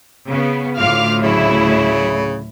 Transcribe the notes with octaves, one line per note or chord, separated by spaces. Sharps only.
C#3 B3
D2 A2 F4 F5 D6 F6
C#3 F#3 E4